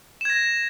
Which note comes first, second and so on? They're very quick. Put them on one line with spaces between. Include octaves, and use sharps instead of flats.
E7 G#6 A#6